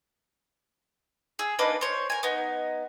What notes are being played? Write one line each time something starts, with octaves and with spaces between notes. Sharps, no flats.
G#4 E6
A#3 D4 D#4 B4
C5 C#5
A#4 G#5
B3 D#4